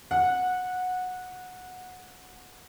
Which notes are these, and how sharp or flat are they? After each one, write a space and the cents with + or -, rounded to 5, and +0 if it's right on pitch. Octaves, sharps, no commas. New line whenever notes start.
F#5 -15